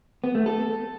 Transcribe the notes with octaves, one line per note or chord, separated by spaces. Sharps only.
B3
A3
A4